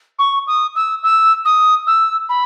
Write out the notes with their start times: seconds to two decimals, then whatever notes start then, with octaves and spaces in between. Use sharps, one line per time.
0.19 C#6
0.47 D#6
0.75 E6
1.03 E6
1.45 D#6
1.87 E6
2.29 B5